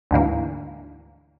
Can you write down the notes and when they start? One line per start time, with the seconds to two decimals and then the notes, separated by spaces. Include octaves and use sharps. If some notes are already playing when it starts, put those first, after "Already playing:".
0.11 D2 G#2 D3 E3 A#3